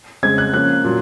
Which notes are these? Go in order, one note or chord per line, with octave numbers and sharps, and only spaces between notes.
C#3 G#3 C4 G#6
F#6
F3 A#3 C#4 F#6
A#2 F#3